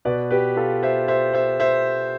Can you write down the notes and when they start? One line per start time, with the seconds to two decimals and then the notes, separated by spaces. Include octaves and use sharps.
0.05 B2 B4 D5
0.31 G4 B4
0.57 F4 A4
0.82 C5 E5
1.08 C5 E5
1.33 C5 E5
1.60 C5 E5